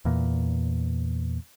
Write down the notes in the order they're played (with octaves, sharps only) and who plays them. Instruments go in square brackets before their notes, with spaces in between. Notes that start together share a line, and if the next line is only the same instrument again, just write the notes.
[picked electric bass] E2 A#2